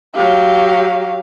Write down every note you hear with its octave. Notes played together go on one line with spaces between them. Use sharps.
F#3 G4 F5